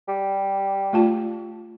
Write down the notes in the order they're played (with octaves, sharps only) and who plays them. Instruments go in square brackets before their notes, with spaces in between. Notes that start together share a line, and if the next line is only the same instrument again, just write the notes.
[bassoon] G3
[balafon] A3 F4 A5